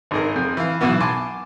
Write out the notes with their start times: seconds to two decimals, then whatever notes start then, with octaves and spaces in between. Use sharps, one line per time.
0.11 G#1 D#4 G#4 A#4
0.36 F2
0.57 E3 F5
0.81 B1 B2 E3 B3
1.00 G#5 A5 C6 D6